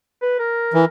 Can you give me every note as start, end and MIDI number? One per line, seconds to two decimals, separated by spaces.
0.22 0.38 71
0.40 0.86 70
0.74 0.85 52